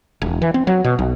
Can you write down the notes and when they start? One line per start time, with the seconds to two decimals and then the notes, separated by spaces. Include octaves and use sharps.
0.22 E1
0.42 E3
0.54 C4
0.67 F#3
0.84 B2
0.99 B1